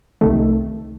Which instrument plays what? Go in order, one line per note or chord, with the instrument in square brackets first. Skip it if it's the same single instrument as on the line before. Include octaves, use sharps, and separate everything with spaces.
[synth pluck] C2 C3 D#3 A3